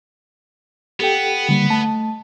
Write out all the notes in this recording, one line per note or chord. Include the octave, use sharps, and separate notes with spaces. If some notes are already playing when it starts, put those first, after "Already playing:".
B3 G4 A4 G5
D3 G3 A#3
A3 A5